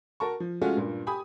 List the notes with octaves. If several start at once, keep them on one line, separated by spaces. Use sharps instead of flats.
F#4 A#4 A5 C#6
F3
G#3 A3 C#4 F4 F#4
G2 A#2
G4 G#5 B5 D#6